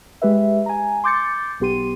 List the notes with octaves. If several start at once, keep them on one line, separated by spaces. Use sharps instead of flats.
G#3 G4 B4 E5
G#5 A#5
C6 D6 G6 A6 C#7
B1 B3 G4 C6 D#7